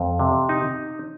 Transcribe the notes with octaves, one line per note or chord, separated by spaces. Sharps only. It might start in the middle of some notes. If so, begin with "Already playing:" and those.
Already playing: F2
C3
D#4